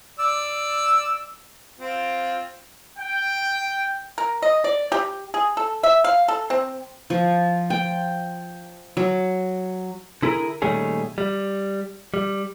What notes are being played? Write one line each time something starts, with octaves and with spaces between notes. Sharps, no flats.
D5 E6
C4 F4
G5
A#4
D#5
D5
G4
G#4
A4
E5
F5
A4
C4
F3
G5
F#3
D3 E4 G#4 A#4
A#2 D#3 G3 A3 C#4 G#4
G3
G3